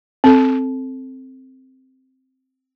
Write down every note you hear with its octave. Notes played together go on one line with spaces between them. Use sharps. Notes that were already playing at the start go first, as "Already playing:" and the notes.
C4 A4